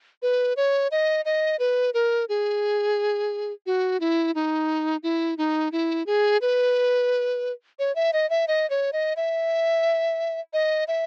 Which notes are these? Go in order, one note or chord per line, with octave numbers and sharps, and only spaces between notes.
B4
C#5
D#5
D#5
B4
A#4
G#4
F#4
E4
D#4
E4
D#4
E4
G#4
B4
C#5
E5
D#5
E5
D#5
C#5
D#5
E5
D#5
E5